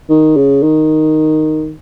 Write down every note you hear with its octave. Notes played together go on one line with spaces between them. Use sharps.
D#3
C#3
D#3